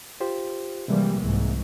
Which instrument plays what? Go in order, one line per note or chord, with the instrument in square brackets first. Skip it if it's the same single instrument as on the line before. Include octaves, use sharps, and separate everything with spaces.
[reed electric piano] F4 G4 C5
[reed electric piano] C3 G#3 A#3 [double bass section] E3 F3 G3
[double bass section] C2 G#2 E3